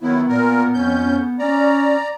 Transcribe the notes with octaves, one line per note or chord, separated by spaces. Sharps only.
D#3 F#3 B3 E4
A#2 A#4
F2 C#4 G6
C#4 D5 A#5